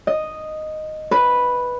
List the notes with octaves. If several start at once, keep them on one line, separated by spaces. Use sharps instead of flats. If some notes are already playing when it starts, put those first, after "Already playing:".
D#5
B4